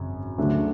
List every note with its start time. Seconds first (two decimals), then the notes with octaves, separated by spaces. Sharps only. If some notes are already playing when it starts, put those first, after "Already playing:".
Already playing: G#1 F#2 C#3
0.38 D2 C#3 F#3 A3 D4